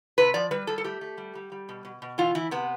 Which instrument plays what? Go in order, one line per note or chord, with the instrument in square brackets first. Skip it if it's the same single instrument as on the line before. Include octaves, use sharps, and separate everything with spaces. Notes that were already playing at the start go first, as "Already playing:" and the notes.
[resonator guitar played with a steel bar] C3 B4
F3 D5
G3 B4
G3 A4
A4
A3 G4
A3
G3
G3
G3
B2
B2
B2
E3 F4
E3 E4
C3 B3